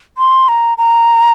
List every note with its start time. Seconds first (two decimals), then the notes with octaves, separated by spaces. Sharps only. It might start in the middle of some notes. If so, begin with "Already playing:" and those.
0.18 C6
0.48 A#5
0.78 A#5